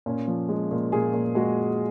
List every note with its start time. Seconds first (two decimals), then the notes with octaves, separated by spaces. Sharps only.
0.06 A#2 C#4
0.28 F3
0.49 G#3
0.71 A#2
0.92 A#2 G#4
1.13 A#2
1.35 G#3 F#4